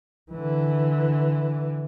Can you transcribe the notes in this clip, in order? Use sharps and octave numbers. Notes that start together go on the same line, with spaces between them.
D3 E3